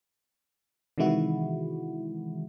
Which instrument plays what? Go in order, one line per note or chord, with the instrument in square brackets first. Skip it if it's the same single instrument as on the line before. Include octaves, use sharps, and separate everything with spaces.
[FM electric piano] C3 D#3 E3 G#3 E4 F#4